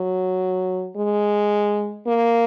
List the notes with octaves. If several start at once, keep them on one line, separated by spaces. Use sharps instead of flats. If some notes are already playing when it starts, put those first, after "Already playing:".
Already playing: F#3
G#3
A#3